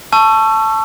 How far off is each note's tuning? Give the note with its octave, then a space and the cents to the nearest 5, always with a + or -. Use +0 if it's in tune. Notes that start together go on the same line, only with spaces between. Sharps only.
A5 +0 C#6 +0 E6 +30